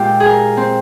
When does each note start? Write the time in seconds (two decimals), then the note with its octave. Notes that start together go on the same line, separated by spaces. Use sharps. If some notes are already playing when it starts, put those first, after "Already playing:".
Already playing: A#2 G#3 F4 G4
0.20 G#4
0.26 A#4
0.57 C4